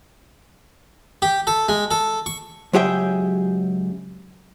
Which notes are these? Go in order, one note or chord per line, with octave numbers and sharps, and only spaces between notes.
G4
A4
G#3
A4
C#6
C#2 F#3 G4 G#4 E5 G5